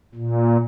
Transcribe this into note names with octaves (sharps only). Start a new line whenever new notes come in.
A#2